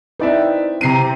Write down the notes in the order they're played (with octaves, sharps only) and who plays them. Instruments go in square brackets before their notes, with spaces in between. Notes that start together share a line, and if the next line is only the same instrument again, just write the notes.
[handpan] C4 E4 B4 [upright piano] D#4 D5 E5
[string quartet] C3 [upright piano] A#5 C7 D#7